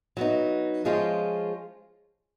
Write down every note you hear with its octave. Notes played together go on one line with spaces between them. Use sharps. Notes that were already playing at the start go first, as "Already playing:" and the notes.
F#3 B3 D#4
F3 G#3 C#4 F4